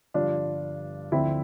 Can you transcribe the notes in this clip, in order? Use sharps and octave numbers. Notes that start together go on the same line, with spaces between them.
G1 G2 F3 D4 F4
D2 D3 F3 C4 E4